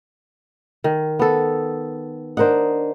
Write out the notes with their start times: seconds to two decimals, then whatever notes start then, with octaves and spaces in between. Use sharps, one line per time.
0.84 D#3
1.19 B3 A4
2.37 D4 A#4 C5 D#5 F#5